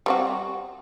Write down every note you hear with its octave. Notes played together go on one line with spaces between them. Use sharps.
G3 C4 F#4